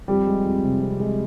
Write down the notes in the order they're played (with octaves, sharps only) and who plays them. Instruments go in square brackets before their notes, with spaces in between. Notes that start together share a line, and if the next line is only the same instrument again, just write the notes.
[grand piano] F2 G3 G4
G#3
F2
C3
F2
G#3